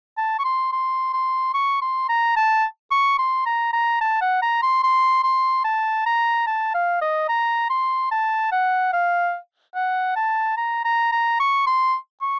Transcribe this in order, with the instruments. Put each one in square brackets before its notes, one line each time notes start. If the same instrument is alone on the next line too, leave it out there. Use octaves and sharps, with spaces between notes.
[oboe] A5
C#6
C6
C6
C6
C#6
C6
A#5
A5
C#6
C6
A#5
A#5
A5
F#5
A#5
C6
C6
C6
A5
A#5
A5
F5
D#5
A#5
C6
A5
F#5
F5
F#5
A5
A#5
A#5
A#5
C#6
C6
C#6